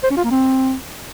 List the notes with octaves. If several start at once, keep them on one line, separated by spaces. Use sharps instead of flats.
C5
C#4
F4
A#3
C4